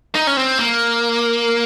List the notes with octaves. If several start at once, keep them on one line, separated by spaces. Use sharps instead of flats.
D#4
C#4
C4
A#3